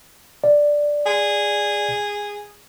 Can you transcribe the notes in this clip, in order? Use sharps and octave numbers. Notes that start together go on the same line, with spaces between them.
D5
G#4